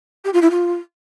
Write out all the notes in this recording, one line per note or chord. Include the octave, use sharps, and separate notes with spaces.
G4
F4
E4
F4